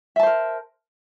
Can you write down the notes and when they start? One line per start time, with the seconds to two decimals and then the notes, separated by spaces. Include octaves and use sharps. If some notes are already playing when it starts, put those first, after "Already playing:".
0.16 E5
0.19 A5
0.23 C5
0.26 A#4